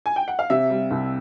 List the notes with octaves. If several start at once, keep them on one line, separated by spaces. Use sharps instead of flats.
G#5
G5
F#5
F5
C3 E5
G3
C2